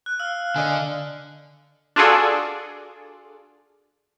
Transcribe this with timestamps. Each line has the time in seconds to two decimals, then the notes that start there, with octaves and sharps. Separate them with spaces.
0.06 F#6
0.20 F5 E6 F6
0.56 D3 D5 D#5 G#5
1.96 D4 F4 F#4 G#4 A4 D5